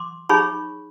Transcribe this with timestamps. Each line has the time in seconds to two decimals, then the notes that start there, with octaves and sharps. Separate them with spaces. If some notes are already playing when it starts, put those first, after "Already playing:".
Already playing: C6 D6
0.29 D#4 G#4 C#5 B5 C#6